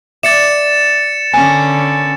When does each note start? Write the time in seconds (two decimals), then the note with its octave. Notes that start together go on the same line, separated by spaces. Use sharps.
0.23 D5 E5 A6 C#7 E7
1.34 D3 A#3 B3 C#4 G#5